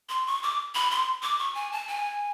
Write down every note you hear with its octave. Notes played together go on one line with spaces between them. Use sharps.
C6
C#6
D6
B5
C6
D6
C#6
G#5
A5
G#5